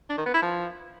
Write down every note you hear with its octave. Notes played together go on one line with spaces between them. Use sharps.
D4
D#3
B3
E4
F3